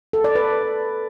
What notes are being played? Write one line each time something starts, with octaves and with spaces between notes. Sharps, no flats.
A4
D5
B4